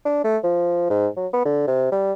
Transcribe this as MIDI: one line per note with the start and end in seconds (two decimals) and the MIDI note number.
0.05 0.23 62
0.24 0.37 57
0.43 0.86 53
0.90 1.07 44
1.17 1.27 54
1.33 1.42 59
1.45 1.64 50
1.67 1.91 48
1.92 2.13 55